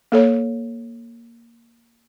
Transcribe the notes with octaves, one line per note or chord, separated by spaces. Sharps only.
A#3 A4 C#5